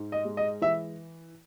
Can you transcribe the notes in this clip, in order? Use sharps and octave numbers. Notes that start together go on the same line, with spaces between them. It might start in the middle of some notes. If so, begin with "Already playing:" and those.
Already playing: G#2
D#5
G#3
D#5
E3 E5